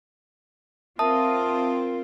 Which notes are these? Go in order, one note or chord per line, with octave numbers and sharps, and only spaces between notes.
C4 F4 A#4 E5 A5 D#6